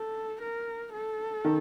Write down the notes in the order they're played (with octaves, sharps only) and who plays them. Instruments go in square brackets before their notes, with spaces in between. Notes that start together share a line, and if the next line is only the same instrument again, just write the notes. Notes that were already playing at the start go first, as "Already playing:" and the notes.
Already playing: [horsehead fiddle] A4
A#4
A4
[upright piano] D#3